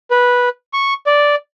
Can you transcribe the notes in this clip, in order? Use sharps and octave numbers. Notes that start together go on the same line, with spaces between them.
B4
C#6
D5